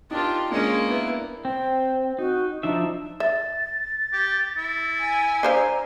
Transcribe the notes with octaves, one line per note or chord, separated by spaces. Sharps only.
D4 D#4 F4 G4 A#4
G#3 A#3 C#4 D4 D#7
B3 E4
C4 G5
D#4 F#4
F3 D4 D#4 E5
E5 A6
G4
E4
G#5
D4 C5 F5 A#5